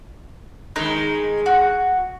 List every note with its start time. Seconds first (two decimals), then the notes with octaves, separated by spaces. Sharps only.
0.76 D#3 G#3 D#4
1.46 F#4